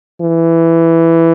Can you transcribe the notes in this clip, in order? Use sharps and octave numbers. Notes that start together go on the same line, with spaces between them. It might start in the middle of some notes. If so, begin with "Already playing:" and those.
E3